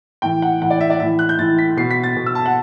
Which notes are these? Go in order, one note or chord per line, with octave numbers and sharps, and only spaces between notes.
A2 E3 G5
F#5
A2 E3 F#5
D5
E5
D5
A2 E3 E5
F#6
G6
A2 E3 A6
B6
B2 C7
B6
A6
B2
E6
A5
F#5